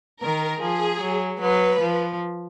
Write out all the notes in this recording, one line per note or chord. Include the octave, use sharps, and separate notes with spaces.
D#3 A#4
F3 G#4
F#3
F#3 B4
F3